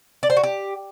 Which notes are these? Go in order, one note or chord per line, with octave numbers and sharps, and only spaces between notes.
D5
C5
F#4
G4